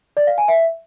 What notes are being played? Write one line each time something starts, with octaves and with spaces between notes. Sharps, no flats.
D5
F5
G#5
E5